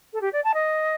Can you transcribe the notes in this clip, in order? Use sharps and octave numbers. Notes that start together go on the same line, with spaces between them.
A4
G4
D5
A5
D#5